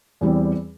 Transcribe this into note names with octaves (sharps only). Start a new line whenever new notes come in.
E2 E3 G3 C4